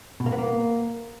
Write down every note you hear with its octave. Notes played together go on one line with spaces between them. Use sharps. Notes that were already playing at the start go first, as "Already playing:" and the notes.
B2
A#3
B3
A#3